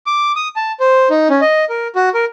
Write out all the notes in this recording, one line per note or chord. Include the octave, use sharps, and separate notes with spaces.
D6
D#6
A5
C5
D#4
C#4
D#5
A#4
F#4
A#4